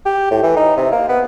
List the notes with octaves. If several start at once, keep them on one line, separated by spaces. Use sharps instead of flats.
G4
A2
E3
D#4
C3
A#3
B3